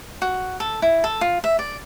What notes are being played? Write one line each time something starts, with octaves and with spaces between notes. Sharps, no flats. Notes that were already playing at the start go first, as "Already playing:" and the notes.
F#4
A4
E4
A4
F4
E5
D5